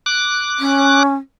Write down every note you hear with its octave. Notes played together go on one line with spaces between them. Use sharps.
D6 F#6
C#4